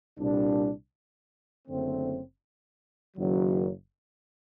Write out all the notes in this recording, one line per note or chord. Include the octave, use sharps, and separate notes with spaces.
C2 A#2 G3 D4
F#1 F#2 D3 A3 C4
F#1 F#2 D#3 F#3